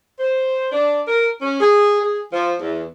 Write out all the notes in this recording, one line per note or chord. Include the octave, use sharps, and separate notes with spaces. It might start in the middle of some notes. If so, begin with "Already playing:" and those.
C5
D4
A#4
C#4
G#4
G#4
F3
E2